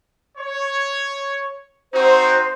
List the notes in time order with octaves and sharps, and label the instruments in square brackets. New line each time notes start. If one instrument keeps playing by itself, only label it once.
[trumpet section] C#5
[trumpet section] C4 D#4 F#4 [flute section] C5